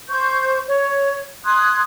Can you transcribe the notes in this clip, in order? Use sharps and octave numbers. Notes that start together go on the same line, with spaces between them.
C5 C#6 G6
C#5
C6 D#6 F#6 G#6